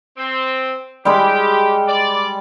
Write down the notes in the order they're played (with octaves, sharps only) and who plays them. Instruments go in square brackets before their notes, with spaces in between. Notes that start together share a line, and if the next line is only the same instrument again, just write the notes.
[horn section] C4
[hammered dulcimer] G3 G#3 B5 [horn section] G4
[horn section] D5